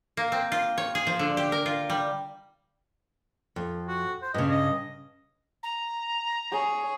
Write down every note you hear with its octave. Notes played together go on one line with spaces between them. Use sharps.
A#3
C4
F4
C#5
G#4
F3
D3
G4
A#4
F4
G3
F2
F#4
C5
G2 C#3 D#5
D#5
A#5
G#4 C#5